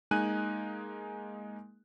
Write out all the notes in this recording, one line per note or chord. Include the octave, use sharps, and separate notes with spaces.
G#3 A#3 D#4 G#5 F#6 D#7